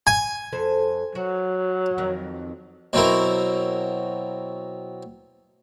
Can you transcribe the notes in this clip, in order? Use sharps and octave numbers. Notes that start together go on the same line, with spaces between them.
G#5
F2 A4 C5
F#3 F#4
F2 D#3
B2 F#3 C4 E4 A#4